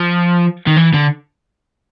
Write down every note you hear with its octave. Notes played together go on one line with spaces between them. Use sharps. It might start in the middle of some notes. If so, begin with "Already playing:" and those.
Already playing: F3
D#3
E3
D3